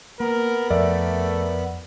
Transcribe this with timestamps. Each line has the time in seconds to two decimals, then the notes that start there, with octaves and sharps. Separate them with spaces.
0.20 A#3 B3 A#4 B5
0.70 F2 A3 A#4 D5 E5